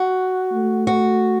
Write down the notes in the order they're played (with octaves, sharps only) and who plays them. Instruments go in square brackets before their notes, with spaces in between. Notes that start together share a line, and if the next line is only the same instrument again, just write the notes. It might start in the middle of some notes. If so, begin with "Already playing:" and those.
Already playing: [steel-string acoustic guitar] F#4
[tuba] A3
[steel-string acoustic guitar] F#4